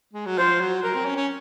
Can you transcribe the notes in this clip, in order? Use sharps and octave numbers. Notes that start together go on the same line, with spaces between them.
G#3
F#3
F3 C5
F#3
F#3 A#4
C4
C#4
C#4